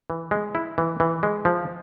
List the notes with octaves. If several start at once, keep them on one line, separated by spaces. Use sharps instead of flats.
E3
G#3
E4
E3
E3
G#3
F3